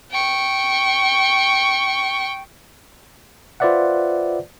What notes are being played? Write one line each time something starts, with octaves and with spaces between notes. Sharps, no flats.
G5 C#6
F4 B4 C5 D5 E5 F#5